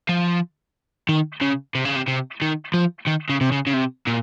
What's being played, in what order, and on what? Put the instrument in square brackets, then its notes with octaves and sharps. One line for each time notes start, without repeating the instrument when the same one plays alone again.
[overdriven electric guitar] F3
D#3
C#3
C3
C#3
C3
C3
D#3
F3
D#3
C#3
C3
C#3
C#3
C3
A#2